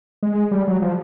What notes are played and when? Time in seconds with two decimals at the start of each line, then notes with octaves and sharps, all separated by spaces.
0.23 G#3
0.52 G3
0.68 F#3
0.82 F3